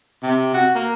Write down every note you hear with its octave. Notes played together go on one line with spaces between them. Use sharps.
C3
F#4
A#3